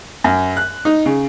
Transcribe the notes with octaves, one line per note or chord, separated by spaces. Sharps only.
F#2
F#6
D#4
C#3